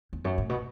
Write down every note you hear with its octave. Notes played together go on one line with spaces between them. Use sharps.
E2
F#2
A2
B2